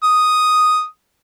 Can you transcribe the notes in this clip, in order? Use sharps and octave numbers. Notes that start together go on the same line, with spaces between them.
D#6